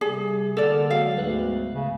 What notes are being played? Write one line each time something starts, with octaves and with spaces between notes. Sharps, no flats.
C3 G3 G#4
D3 A#3 A4 D5 E6 F6
F#3 G#3 F#4 F5
D2 G#2 B3 F#6
C#3